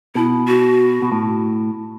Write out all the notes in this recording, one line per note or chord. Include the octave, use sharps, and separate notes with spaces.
B2 E4
F#4
B2
A2